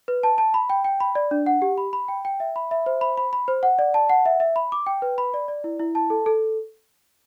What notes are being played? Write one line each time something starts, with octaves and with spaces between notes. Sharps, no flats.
B4
A5
A5
B5
G5
G5
B5
D5
D4
F#5
G4
B5
B5
G5
G5
E5
B5
E5
C5
B5
B5
B5
C5
F#5
D5
A5
F#5
E5
E5
B5
D6
G5
B4
B5
D5
D5
E4
E4
A5
A4
A4